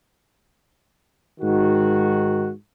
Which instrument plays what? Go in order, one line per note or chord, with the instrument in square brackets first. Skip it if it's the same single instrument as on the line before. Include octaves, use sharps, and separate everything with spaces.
[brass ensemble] G#2 D#3 F#4